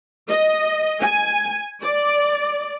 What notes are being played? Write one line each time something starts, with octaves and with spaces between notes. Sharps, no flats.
D#5
G#5
D5